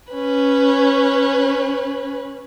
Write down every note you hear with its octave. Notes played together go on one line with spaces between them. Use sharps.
C#4 B4